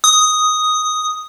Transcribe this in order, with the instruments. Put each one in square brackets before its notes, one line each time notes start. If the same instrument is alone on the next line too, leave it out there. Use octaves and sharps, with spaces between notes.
[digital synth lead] D#6